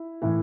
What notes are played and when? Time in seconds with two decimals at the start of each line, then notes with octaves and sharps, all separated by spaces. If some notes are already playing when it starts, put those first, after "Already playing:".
Already playing: E4
0.22 A2 E3